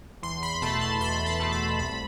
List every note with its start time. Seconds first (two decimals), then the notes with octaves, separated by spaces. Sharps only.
0.23 E2 C6
0.43 B5
0.62 B2 A3 A5
0.81 C6
1.00 E2 B5
1.26 A5
1.40 B2 A3
1.52 B5
1.79 C2 B5